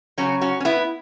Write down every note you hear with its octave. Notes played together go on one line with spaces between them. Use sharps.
C#3 F#3 C#4 F#4
C#4 F#4
C#4
B3 E4